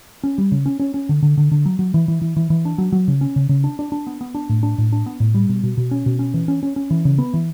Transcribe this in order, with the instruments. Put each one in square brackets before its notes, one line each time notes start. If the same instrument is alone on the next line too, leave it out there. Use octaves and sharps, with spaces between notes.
[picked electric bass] C#4
G3
C#3
C#4
C#4
C#4
D3
D3
D3
D3
F#3
F#3
E3
E3
E3
E3
E3
D4
F#3
F#3
C#3
C#4
C#3
C#3
D4
D4
D4
B3
B3
D4
A2
D4
A2
D4
B3
A2
G3
B2
B2
B2
C#4
B2
C#4
E3
C#4
C#4
C#4
E3
C#3
B3
E3